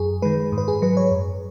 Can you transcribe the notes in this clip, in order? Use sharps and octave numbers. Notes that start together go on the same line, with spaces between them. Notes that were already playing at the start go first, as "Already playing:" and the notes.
Already playing: F#2 G#4
D#3 G#3 B4
G#2
B4
G#4
F#3 B4
C#5
F#2